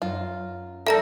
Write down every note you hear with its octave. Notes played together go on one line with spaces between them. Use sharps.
F#2 F4
G3 A4 A#4 E5 A#5 A#6